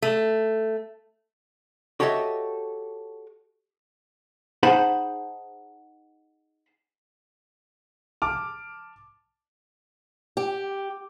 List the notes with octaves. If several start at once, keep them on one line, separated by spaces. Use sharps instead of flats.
A3
F#4 G4 A4 C#5 D#5 E5
D#4 G#4 C5 F#5 A5 B5
A5 D6 F6
G4